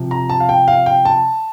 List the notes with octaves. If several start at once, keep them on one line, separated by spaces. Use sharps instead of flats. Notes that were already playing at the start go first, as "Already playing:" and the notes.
Already playing: C3 F3
A#5
A5
F5
G5
F5
G5
A5